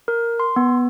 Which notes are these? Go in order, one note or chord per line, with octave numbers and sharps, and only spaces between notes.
A#4
C6
B3